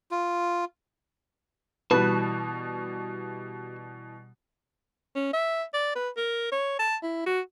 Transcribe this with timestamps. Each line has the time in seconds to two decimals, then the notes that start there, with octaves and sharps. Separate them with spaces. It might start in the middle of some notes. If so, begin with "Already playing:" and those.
0.11 F4
1.91 B2 E3 G3 F#4 B4 A5
5.16 C#4
5.33 E5
5.74 D5
5.95 B4
6.17 A#4
6.52 C#5
6.79 A5
7.03 E4
7.26 F#4